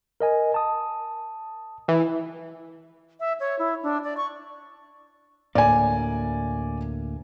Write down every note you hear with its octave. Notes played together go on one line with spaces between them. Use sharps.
A#4 D#5 G#5
A5 D#6
E3
E5
C#5
E4
D4
D5
C#6
D2 A2 A#3 D5 G#5